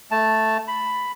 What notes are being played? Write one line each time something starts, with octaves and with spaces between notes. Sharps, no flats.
A3 A5
B5